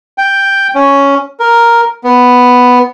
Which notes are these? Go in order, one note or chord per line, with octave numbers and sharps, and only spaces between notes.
G5
C#4
A#4
B3